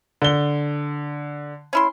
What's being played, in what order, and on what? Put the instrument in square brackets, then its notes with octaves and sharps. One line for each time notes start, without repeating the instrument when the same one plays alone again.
[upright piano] D3 G7
[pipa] C#4 E4 C6